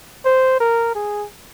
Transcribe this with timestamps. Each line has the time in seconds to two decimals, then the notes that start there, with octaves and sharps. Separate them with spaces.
0.25 C5
0.60 A#4
0.95 G#4